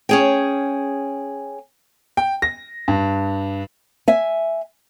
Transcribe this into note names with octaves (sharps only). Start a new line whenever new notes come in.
C#4 G#4 G5
G5
A#6
G2
E5 G#5